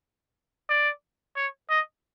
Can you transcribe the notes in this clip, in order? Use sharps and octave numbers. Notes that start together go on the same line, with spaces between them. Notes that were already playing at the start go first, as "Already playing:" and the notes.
D5
C#5
D#5